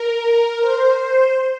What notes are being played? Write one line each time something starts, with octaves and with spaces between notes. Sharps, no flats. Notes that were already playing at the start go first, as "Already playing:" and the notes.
Already playing: A#4
C5